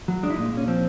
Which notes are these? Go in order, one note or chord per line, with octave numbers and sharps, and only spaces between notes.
F#3
G#3 D4
E4
D#4
A#2
A#2 C#4
F3 C4